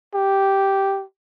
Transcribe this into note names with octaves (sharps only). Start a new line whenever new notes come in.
G4